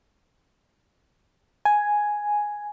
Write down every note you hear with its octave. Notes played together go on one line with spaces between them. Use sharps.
G#5